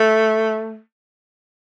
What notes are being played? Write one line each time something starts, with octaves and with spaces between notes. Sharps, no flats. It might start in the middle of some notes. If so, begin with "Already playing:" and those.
Already playing: A3